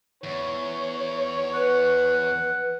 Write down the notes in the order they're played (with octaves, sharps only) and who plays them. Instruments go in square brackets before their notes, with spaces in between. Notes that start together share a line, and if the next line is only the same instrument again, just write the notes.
[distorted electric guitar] E2 [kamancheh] C#5
[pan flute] B4 [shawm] F#5